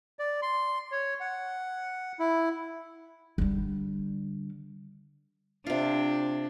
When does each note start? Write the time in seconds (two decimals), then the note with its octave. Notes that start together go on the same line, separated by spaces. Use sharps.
0.19 D5
0.42 C6
0.92 C#5
1.20 F#5
2.19 E4
3.38 D3 G3
5.67 C3 D4 F4